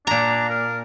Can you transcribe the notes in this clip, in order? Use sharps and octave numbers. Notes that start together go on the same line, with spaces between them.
A#2 D4 A#5
A#4